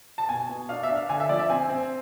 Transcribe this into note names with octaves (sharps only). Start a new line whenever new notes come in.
A5
B2 G#5
B2
D4 F5
E5
D4
F5
D3 G#5
E5
F3 D5
E5
C4 G#5
C4